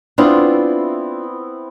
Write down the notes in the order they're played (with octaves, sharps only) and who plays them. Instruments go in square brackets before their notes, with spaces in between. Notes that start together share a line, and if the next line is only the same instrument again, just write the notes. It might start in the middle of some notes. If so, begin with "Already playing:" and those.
[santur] B3 C4 E4 [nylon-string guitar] D4 F4